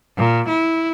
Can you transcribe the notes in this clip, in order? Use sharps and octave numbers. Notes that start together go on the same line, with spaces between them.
A#2
E4